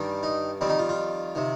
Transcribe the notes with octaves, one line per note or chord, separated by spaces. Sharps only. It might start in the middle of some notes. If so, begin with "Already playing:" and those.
Already playing: G2 D#3 G3
D#4
F2 D#3 G3 C4
D#4
F4
F4
C3 D#3